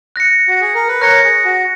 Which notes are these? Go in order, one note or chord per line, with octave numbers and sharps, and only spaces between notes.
F#6 A#6 C#7
F#4
G#4
A#4
B4
A#4 C#5 F#6 A#6 C#7
G#4
F#4